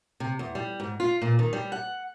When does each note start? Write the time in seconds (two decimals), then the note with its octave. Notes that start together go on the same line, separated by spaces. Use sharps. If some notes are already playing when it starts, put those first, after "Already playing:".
0.20 C3
0.39 E2
0.55 G3
0.80 G#2
1.00 F4
1.22 A#2
1.39 D#3
1.53 G3
1.72 F#5